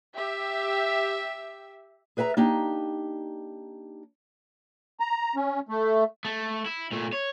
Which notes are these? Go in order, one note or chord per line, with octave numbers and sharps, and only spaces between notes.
G4 E5
G#4 B4 E5 G#5 A#5
A#3 D4 D#4 G4
A#5
C#4
A3
A3
E4
A#2 A3
C#5